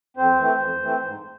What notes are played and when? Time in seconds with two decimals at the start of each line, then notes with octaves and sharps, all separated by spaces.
0.17 F2 C4 C5
0.39 E3 A3 C4
0.61 F2
0.83 E3 A3 C4
1.05 G#2